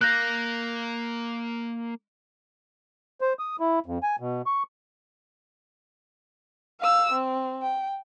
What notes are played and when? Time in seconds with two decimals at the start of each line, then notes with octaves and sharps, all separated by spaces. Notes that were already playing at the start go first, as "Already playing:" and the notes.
0.01 A#3 F5 F#6 G6 A#6
3.21 C5
3.39 D#6
3.60 E4
3.86 F2
4.03 G#5
4.20 B2
4.46 C#6
6.80 F5 E6
7.12 C4
7.62 G5